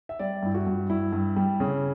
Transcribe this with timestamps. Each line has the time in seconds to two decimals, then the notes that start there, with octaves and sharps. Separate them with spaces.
0.09 E5
0.19 G3 D5
0.43 G2 E4
0.55 F#4
0.67 G2
0.90 G2 E4
1.12 G2
1.36 G3
1.60 C#3